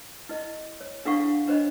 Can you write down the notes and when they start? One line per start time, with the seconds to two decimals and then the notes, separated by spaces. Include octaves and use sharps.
0.29 E4 D#5
0.81 C#5
1.05 D4 E4 A4 F5 F#5 C#6
1.48 D4 C5 C#5 D#5 B5